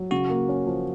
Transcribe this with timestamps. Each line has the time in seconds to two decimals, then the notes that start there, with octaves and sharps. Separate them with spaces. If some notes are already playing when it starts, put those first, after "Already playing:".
Already playing: F#3
0.11 C#3 F#4
0.30 A#3
0.49 C#4
0.66 F3